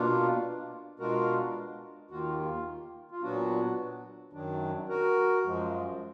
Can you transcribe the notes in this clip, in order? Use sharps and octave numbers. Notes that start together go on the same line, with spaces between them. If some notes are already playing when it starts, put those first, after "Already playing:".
Already playing: B2 A#3 D4 F4
B2 G#3 D4 F4 F#4 A#4
D#2 D#3 A#3 F4 F#4
F4
F4
A#2 F#3 B3 D4 F#4
F#2 D#3 F#3 D4
F#4 A#4
F#2 F3 G#3